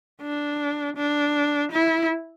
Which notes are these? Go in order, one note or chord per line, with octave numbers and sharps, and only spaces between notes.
D4
D4
E4